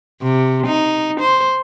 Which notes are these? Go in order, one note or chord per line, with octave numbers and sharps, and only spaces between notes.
C3
D#4
C5